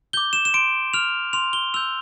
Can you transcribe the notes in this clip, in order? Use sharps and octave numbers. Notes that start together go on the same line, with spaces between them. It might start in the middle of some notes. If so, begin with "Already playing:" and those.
D6 G6 G7
E7
E7
C6 D7
F6 F7
C6 F7
G7
E6 G6 F7